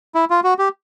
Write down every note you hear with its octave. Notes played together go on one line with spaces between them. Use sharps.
E4
F4
F#4
G4